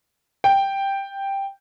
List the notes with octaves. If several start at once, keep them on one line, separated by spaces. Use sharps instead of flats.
G5